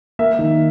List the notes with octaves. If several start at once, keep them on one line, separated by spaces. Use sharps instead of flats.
A#3 E5
D#3